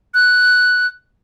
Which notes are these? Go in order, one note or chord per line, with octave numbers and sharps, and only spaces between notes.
F#6